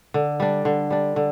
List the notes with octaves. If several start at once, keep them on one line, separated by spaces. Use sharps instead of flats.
D3
G3 D4
D3
G3 D4
D3